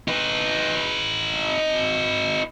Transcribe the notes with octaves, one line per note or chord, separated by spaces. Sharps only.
D#4 B4